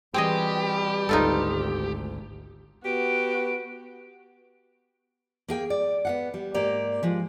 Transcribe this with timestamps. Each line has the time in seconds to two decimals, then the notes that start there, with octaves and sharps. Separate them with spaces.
0.14 B2 E3 G3 C4 G4 G#4 D#5
1.09 G#1 D2 D#4 F4 A4
2.85 B3 F#4 G4 D7
5.48 A#3 G#4 G5
5.70 D5
6.05 B3 F5 F#5
6.34 G3
6.54 G#2 A#3 G4 D5 A#5
7.03 F3 G#3 F4